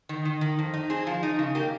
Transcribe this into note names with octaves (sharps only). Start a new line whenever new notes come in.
D#3
D#3
D#3
F2
D#4
C4 G#4
F3
D#4
C#3
A#3 G4